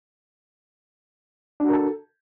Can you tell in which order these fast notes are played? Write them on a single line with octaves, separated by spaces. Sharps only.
D4 F#4 A#4 A4